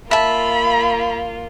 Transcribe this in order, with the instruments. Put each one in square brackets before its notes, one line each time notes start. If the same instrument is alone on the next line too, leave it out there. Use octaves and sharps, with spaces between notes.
[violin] A#3 F4 [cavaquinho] E5 A5 [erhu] B5